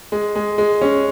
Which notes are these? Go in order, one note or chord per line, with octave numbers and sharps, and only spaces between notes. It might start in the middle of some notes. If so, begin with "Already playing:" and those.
G#3
G#3
G#3
C#4